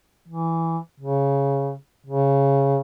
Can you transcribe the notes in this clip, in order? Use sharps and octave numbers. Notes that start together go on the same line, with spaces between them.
E3
C#3
C#3